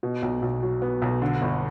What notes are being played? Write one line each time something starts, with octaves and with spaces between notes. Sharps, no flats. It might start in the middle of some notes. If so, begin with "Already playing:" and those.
B2
B1
B1
F#3
B3
B1
D3
G1